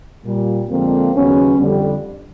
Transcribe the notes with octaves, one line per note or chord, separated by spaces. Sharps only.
A#2 G3
F2 D3 F3 G#3 A#3 C4
D#2 C#3 F#3 B3 C#4
F2 D3 G3